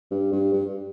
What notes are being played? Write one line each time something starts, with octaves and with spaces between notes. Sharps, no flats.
G2
G2
G2